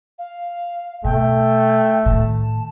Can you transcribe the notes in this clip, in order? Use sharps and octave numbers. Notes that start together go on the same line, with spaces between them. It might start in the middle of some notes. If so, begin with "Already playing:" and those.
F5
B2 A3 G5
A2 D#3 A5